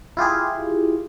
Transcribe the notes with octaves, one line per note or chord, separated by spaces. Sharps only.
E4 F4 G4 G#4